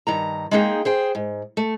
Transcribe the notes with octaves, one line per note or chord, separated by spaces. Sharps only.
G2 D#3 A#5
G#3 A#3 D#4 E4 G#4 G5
G#4 C5 G5
G#2
A3